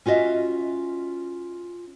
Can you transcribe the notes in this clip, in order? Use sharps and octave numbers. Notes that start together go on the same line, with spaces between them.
C#4 F4 F#4 D#5 E5